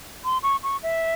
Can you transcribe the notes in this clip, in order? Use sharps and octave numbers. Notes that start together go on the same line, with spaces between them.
C6
C#6
C#6
E5